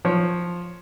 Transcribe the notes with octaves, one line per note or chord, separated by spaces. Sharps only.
F3 C#5